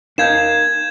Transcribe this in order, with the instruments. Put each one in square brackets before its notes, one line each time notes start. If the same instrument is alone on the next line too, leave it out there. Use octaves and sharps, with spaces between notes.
[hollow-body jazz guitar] D#4 A#4 F5 [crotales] G6 G#6 E7